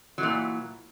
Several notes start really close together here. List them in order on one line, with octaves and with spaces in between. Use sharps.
F#3 E3 A#2